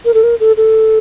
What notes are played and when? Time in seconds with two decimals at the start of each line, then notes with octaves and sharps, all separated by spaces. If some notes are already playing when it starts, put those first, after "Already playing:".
0.05 A#4
0.14 A4
0.23 A#4
0.40 A4
0.57 A4